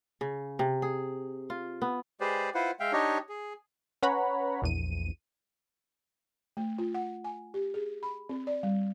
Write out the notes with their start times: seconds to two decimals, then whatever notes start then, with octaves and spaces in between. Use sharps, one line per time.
0.21 C#3
0.59 C3
0.82 G#4
1.50 F4
1.82 B3
2.21 G#3 G4 G#4 B4 C5 D5
2.55 E4 F4 B4 C5 F#5
2.80 G#3 E5 F5 G5
2.93 D4 D#4 G4 C#5 D#5
3.29 G#4
4.03 C#4 B4 C#5 F#5 A#5 B5
4.62 A#1 E2 D#7
6.57 A3
6.78 F4
6.94 F#5
7.24 G#5
7.54 G4
7.74 G#4
8.03 B5
8.29 C4
8.47 D5
8.63 G3